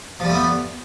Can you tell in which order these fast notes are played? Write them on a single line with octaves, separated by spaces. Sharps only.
F3 G3 A3 B3